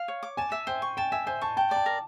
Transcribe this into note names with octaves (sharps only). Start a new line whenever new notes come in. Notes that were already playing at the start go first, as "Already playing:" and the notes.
Already playing: F5
C#5
D6
G#5 A5
E5
C5 G5
C#6
G5 A5
E5 G#5
C5 G#5
A5 C#6
G5 A5
D5
A5
A#4